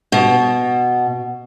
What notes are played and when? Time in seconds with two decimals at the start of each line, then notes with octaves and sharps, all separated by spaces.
0.12 B2